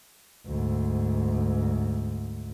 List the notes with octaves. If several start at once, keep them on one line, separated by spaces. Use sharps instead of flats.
D2 G#2